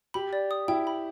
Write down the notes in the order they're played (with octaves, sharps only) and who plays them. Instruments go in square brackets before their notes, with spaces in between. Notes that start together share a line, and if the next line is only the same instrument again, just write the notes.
[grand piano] G4 [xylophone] B5
[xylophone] D5
D#6
[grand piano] E4 [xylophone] G5
[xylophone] B5